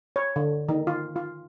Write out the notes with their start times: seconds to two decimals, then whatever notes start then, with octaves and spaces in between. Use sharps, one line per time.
0.16 C#5
0.36 D3
0.69 D#3
0.87 F4
1.16 F4